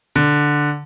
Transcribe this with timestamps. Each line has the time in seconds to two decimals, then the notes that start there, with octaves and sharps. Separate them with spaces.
0.16 D3